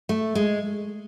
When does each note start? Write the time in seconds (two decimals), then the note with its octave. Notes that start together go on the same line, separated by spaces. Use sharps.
0.09 A3
0.35 G#3